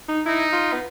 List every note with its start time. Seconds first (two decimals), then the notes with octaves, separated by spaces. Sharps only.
0.08 D#4
0.26 D#4 E4
0.53 F4
0.73 B3